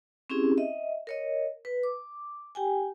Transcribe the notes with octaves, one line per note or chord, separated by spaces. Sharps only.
C4 C#4 E4 G4 G#4
D#5 E5
A#4 C#5 D#5
B4
D6
G4 G5 G#5